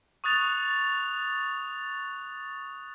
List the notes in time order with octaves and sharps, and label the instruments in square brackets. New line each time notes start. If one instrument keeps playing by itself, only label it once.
[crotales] C#6 D#6 F#6 A6 F7